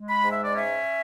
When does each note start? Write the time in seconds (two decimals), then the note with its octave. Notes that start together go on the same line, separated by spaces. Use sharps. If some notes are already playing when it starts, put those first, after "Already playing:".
Already playing: G#3
0.09 B5
0.23 G#2
0.31 E5
0.44 D5
0.53 C#4 E5